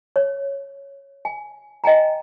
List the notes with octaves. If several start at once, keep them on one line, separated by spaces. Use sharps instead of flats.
C#5
G#5
D#5 G5 G#5 A#5